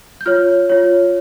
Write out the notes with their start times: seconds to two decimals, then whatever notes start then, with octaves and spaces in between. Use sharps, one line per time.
0.21 G6
0.26 F4 C#5 F6
0.69 F4 C#5